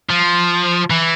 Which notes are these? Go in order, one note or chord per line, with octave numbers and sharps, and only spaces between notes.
F3
E3